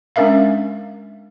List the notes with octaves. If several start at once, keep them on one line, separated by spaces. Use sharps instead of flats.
G#3 C#4 D4 A#4 E5 F5